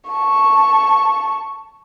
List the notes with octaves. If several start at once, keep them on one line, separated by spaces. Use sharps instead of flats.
A5 C#6